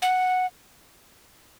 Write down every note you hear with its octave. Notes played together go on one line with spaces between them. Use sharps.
F#5